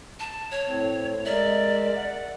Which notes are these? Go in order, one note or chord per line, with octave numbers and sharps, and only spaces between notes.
A5
C#5
A2 C4
G#3 A#4 D5 E5
F#5